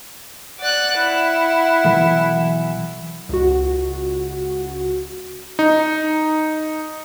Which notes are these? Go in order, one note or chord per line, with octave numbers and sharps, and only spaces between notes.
D5 F#5 F#6
E4
B1 E3
C#2 F#4
D#4